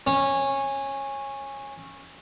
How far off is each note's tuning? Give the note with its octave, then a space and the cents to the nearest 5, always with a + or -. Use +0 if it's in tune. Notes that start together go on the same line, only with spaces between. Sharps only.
C#4 -15